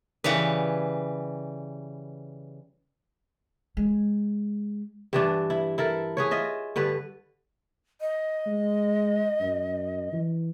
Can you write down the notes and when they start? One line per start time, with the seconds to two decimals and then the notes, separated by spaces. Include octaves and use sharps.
0.24 C#3 E3 G3 B4
3.77 G#3
5.13 G2 E3 D4
5.50 E4
5.78 E4 A4 A#4
6.17 G#4 B4 C#5
6.31 F4 D#5 E5
6.76 G2 D3 B4
8.01 D#5
8.47 G#3
9.41 F#2
10.13 E3